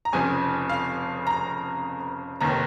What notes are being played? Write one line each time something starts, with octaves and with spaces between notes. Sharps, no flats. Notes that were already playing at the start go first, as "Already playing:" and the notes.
A#5
F1 F2 C#3 F3 G#5
F5
A#5
F1 D#2 D#3 A#5